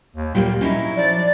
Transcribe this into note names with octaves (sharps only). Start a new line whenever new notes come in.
D#2
A#2 G3 A3 A#3
F#3 C#4 D#4 E4
F3 D5